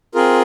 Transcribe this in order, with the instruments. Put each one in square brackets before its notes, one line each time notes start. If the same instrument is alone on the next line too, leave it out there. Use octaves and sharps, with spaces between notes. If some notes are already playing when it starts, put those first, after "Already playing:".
[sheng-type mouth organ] C4 F4 G#4 A#4